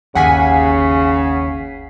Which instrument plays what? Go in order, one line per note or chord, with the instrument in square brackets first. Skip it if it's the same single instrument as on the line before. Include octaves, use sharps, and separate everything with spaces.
[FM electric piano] G1 B6 C7 [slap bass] D#2 [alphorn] C#3 [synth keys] F#5 G#5